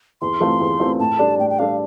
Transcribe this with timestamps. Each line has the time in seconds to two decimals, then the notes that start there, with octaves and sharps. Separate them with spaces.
0.21 E2 C6
0.40 E3 A3 C4 F4
0.60 E2
0.80 E3 A3 C4 F4
0.99 A2 A5
1.19 G3 D4 A4 D5
1.39 A2 G5
1.50 G5
1.59 G3 D4 A4 D5 F5